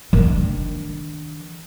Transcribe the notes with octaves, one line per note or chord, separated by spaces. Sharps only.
D#3 D4